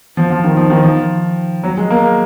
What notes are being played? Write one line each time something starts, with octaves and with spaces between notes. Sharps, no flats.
F3
F3
D#3
F3
D#3
F3
F#3
G#3
A#3